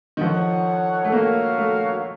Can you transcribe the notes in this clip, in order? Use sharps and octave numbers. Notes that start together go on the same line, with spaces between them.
D#3
F3 D#4 A4 C#5 F#5
A3
A#3 F#4 A#4 C#5 F5
A3